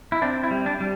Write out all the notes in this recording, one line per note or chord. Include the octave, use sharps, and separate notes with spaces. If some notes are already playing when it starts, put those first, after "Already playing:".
E4
C4 D4
E4
G3
D4
G3